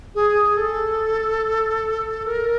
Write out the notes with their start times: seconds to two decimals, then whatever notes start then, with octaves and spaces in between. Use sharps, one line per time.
0.15 G#4
0.57 A4
2.26 A#4